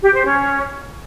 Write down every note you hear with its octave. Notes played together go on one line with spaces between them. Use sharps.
G4
C5
C#4